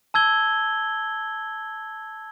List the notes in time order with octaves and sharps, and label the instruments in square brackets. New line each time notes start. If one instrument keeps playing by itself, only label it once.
[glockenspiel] A5 E6 G#6 G7